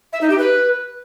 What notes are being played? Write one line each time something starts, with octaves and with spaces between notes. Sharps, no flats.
E5
D#4
G4
B4